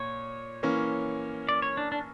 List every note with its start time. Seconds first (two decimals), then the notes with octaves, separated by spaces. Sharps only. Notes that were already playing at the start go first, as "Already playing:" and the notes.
Already playing: A#2 C#5
0.63 E3 A#3 C#4
1.49 D5
1.62 C#5
1.77 D4
1.92 D4